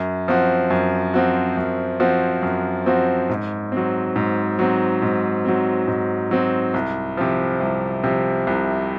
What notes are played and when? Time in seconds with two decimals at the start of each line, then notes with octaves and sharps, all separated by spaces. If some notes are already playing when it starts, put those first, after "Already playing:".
Already playing: F#2
0.28 F3 C4 F#4
0.70 F#2
1.14 F3 C4 F#4
1.57 F#2
2.00 F3 C4 F#4
2.43 F#2
2.86 F3 C4 F#4
3.29 G#2
3.72 F#3 C4
4.16 G#2
4.59 F#3 C4
5.02 G#2
5.45 F#3 C4
5.87 G#2
6.31 F#3 C4
6.74 C2
7.17 C3 F3
7.60 C2
8.04 C3 F3
8.47 C2